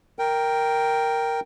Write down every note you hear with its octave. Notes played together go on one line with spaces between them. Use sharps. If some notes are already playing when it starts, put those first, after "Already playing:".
A#4 G5